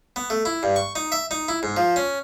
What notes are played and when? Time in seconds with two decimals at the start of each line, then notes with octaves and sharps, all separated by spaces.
0.16 B3
0.30 A3
0.45 E4
0.63 G2
0.76 C#6
0.96 D#4
1.12 E5
1.31 D#4
1.48 E4
1.63 G#2
1.77 F3
1.96 C#4